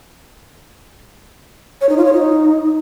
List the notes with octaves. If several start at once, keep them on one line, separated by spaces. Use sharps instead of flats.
C#5
D#4
F4
C#5
D#4